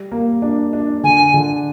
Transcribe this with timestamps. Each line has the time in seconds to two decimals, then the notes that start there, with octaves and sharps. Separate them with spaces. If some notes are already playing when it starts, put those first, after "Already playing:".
Already playing: G3
0.12 A#3
0.42 D4
0.73 D4
1.03 D3 G#5
1.34 D3